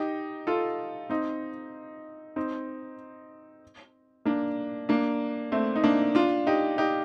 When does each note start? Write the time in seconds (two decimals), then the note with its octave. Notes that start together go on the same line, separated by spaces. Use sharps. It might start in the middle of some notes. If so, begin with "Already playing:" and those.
Already playing: D#4 G4
0.47 F4 A4
1.10 C4 D#4
2.36 C4 D#4
4.25 A#3 D4
4.89 A#3 D4
5.52 A3 C4
5.76 D#4
5.84 A#3 D4
6.15 D4 F4
6.47 D#4 G4
6.78 D#4 G4